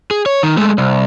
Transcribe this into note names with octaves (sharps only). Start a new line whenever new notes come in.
G#4
C#5
D#3
G#3 A3
C2